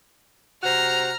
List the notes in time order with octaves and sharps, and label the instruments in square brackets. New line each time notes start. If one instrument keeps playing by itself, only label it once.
[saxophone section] C3 F#4 C5 [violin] A#5 F6